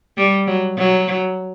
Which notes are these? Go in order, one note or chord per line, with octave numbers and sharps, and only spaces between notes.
G3
F#3
F#3